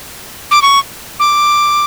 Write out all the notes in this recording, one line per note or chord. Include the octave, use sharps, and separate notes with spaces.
D6
C#6
D6